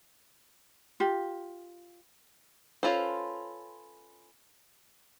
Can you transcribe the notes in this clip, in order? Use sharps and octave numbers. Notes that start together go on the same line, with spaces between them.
F4 G4
C#4 F4 A4 B4 C5